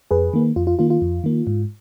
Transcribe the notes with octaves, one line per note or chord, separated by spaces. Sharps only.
F2 G#4 B4
D#3 A#3
F2 F4
F4
D#3 A#3 F4
F4
F2
D#3 A#3
G#2